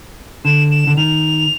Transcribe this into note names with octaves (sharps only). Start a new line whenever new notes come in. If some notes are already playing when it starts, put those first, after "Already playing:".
D3 E7
E7
D3
D#3 F7